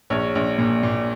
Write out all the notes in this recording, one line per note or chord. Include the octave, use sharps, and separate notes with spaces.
A#1 C#5
A#1
A#2
A#2